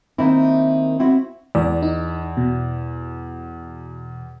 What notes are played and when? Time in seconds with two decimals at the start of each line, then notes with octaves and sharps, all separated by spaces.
0.18 D#3 A#3 C4 E4
1.00 C4 E4 F#4
1.55 E2 D5
1.83 D#4
2.37 B2